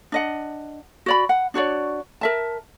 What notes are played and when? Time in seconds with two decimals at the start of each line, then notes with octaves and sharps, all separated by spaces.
0.12 D4 D#5 F#5
1.06 F#4 D5 B5
1.29 F#5
1.54 D4 F#4 C#5 D5
2.21 A#4 E5 A5